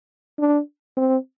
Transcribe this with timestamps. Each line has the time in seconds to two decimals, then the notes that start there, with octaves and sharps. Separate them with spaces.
0.39 D4
0.97 C4